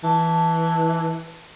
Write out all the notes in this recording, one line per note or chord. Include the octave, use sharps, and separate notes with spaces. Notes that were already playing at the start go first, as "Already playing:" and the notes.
E3 A5